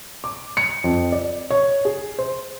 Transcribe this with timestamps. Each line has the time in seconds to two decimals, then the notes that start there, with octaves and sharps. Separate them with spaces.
0.24 D6
0.57 C#7
0.84 F2
1.12 D5
1.50 C#5
1.85 G#4
2.19 C5